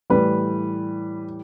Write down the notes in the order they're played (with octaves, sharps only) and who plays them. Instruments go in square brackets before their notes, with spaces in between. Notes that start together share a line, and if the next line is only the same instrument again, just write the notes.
[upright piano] A2 E3 G3 B4